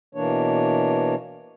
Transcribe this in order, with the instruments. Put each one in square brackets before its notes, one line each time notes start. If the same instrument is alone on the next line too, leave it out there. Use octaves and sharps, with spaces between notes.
[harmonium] B2 E3 A#3 D4 C#5